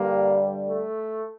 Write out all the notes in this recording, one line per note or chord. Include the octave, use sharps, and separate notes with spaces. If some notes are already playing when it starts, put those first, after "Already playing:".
Already playing: G2 D3 G3 A#3
A3